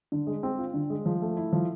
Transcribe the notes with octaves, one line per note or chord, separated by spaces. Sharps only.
D3
G#3
C4
F4
D3
G#3
F3
A3
E4
F3